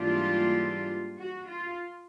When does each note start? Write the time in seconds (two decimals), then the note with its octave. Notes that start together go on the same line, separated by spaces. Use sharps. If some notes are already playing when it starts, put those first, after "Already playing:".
Already playing: G#2 E3 G3 A#3 D4 F4 G4
1.19 F#4
1.50 F4